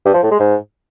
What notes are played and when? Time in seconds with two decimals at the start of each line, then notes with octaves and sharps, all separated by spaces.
0.06 G2
0.14 F3
0.23 A2
0.31 G#3
0.40 G#2